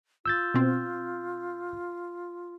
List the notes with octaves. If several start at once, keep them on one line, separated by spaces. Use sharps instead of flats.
F4 E6 G6 A6
B2 C4